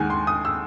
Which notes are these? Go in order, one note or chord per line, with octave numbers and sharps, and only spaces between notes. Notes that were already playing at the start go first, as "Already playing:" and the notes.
Already playing: D#2 D#3 G#3 F#5 G#5
C6
D#6
E6